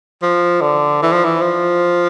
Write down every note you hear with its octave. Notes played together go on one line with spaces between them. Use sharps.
F3
D3
E3
F3
E3
F3